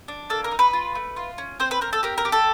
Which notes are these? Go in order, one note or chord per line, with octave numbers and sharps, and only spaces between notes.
D4
A#3 A4
A#4
D#4
B4
F4
A3
F4
C#4
C4 C5
B4
C4 A#4
A4
G4 A#4
A#4
G4
A4